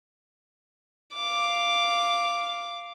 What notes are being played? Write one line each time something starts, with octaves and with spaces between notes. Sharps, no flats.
F5 D6